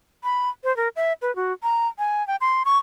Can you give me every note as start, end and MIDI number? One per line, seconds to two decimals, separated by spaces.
0.24 0.49 83
0.64 0.75 72
0.77 0.88 70
0.96 1.13 76
1.22 1.34 71
1.36 1.53 66
1.63 1.88 82
1.99 2.26 80
2.28 2.36 79
2.41 2.63 84
2.65 2.78 85